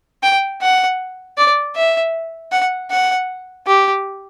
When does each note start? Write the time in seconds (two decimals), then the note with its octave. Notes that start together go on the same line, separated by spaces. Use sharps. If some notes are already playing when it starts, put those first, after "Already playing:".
0.23 G5
0.62 F#5
1.37 D5
1.76 E5
2.52 F#5
2.90 F#5
3.67 G4